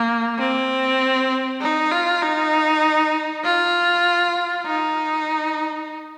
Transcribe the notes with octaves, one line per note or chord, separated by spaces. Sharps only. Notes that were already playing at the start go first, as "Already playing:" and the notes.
Already playing: A#3
C4
D#4
F4
D#4
F4
D#4